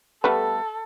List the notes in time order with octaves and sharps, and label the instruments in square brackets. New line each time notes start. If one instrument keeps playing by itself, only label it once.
[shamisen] G3 A3 B3 [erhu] A4